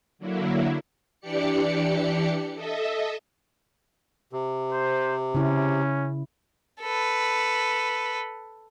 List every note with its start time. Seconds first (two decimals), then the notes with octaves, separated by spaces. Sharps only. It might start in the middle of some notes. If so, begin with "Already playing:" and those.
0.19 D3 F#3 A#3 E4
1.20 E3 D4 G4 D5 C#7
2.54 A4 D#5 E5
4.33 C3
4.72 C5
5.35 C#3 C#4 E4
6.82 A4 B4